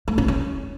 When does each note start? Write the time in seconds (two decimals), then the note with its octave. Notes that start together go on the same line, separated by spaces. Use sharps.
0.08 A3
0.18 C#4
0.28 C#4